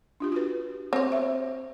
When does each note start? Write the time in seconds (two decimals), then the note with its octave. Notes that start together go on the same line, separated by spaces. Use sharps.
0.20 D4 F4 G4
0.32 F4 F#4 B4
0.93 C4 C#5
1.12 E5